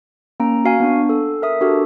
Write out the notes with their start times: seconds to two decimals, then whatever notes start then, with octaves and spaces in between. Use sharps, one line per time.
0.40 A#3 C#4 A#5 D7
0.65 F#4 F5 G#5
0.80 B3 D4 C#6
1.09 A4
1.42 A#4 E5 D#6
1.61 D4 F#4 G4 A4 A#4